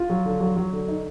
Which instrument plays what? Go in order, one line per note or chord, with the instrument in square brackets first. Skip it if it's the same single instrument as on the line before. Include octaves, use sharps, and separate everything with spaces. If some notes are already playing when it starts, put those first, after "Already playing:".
Already playing: [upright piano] F4
[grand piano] F#3
D3
F#3
F#3
D3
D#4